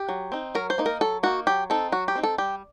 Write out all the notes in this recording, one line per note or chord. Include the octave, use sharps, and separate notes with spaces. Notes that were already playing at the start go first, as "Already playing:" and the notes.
Already playing: G4
F#3
C4 D#4
F#3 A#4
C5
A#3 D#4
A#4
F#3 A4
A#3 D#4 F#4
F#3 G4
C4 D#4 A4
F#3 F#4
G4
C4 D#4
A4
G3 G4